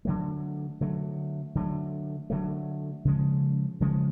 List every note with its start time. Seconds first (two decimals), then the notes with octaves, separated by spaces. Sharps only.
0.05 D3 F#3 A3
0.81 D3 F#3 A3
1.55 D3 F#3 A3
2.30 D3 F#3 A3
3.05 C#3 F3 G#3 C#4
3.80 C#3 F3 G#3 C#4